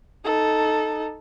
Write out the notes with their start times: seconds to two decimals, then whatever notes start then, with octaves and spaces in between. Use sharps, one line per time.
0.25 D#4 A4